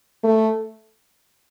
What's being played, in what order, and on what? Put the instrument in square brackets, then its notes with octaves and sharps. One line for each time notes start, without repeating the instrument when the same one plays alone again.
[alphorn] A3